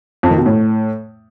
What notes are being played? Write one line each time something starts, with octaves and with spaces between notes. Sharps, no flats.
F2
D#3
B2
A2